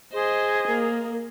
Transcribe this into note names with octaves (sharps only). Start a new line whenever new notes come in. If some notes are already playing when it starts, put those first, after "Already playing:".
G#4 C5 D#5
A#3 A#4